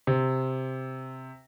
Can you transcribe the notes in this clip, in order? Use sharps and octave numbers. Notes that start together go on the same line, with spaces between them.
C3